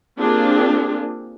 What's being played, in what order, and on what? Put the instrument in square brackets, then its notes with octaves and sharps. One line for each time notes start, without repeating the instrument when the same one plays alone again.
[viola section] A#3 C4 D4 F4 G4 G#4